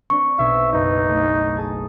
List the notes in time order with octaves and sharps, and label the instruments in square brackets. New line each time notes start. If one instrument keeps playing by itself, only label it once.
[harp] C4 D4 [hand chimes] C#6
[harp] B1 G#6 [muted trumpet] E5
[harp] F#1 B4 [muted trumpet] D#4
[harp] A3
G#4 A5 D#6